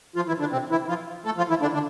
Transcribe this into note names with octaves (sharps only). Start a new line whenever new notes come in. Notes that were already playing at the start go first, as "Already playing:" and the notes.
F3 F4
E3 E4
D3 D4
C3 C4
E3 E4
F3 F4
A3 A4
F3 F4
E3 E4
D3 D4
D3 D4